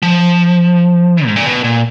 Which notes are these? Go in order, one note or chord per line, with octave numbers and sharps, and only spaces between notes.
F3
G#2
A#2
B2
A#2